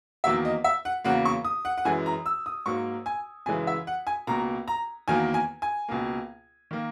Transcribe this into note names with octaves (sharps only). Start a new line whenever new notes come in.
E2 D#3 F#3 A#3 E5
D#5
E5
F#5
E2 C#3 F#3 A#3 F#5
C#6
D#6
F#5
F#5
F#2 E3 G#3 G#5
A#5
E6
D#6
G#2 F#3 A#3 C#6
G#5
F#2 C#3 E3 G#3 G#5
E5
F#5
G#5
C#2 B2 A#3 A#5
A#5
E2 D#3 F#3 A#3 G#5
G#5
G#5
C#2 B2 A#3
D#3 A#3